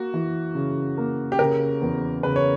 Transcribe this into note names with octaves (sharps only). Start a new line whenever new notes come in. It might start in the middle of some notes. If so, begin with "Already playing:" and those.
Already playing: A#3 F#4
E3
C#3
A#3
G4
C#3 A#4
E2
C#3 B4
C#5